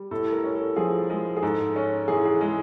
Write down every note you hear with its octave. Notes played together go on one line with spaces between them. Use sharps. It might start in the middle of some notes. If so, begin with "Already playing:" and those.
Already playing: G3
A2 A4
A#4
C#4
A4
F3 G#4
G#3
G#4
G#2 A4
C#4
E3 G#4
G#4
G#3